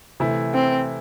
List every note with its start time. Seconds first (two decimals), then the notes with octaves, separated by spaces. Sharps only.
0.20 C3 E3 A3 E4
0.54 C4